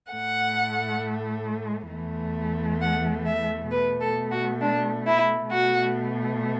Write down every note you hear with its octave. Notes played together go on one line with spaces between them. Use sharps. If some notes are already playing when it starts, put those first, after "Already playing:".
A2 A3 F#5
E2 E3 A3
F#5
E5
B2 A3 B4
A4
F#4
D4
E4
B2 A3 F#4